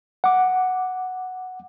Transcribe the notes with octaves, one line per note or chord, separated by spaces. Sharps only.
F#5 D6